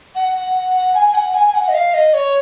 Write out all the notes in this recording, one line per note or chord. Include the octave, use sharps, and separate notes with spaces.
F#5
F#5
F#5
F#5
G#5
G#5
F#5
G#5
G#5
F#5
D#5
F5
D#5
C#5